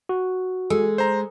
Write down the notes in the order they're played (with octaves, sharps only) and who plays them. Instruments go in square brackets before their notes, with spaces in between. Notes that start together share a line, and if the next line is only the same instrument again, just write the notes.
[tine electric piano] F#4
[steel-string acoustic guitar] G#3 [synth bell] A4
[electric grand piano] C5 A#5